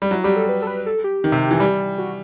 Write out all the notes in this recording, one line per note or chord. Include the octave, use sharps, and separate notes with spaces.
G3
F#3 E4
G3 G4
A4
B4
A4
B4
A4
G4
D#3
C3
E3
G3
F#4